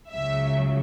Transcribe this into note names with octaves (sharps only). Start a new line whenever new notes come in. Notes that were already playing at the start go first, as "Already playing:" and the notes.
C#2 C#3 F#3 E5